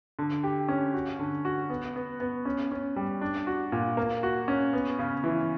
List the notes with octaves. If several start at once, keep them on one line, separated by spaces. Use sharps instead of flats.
D3
G4
C#4
F#4
D3
F#4
B3
B3
B3
C#4
C#4
G3
D4
F#4
A#2
A#3
F#4
C#4
B3
C#3
E3